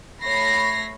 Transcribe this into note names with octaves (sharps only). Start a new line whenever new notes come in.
A3 C#5 B5 A#6 C7